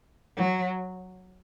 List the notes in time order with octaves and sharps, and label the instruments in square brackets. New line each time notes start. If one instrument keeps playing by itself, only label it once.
[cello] F#3